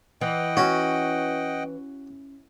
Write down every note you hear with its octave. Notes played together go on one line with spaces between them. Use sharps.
E3 D#5 F#5 G5
C#4 F#4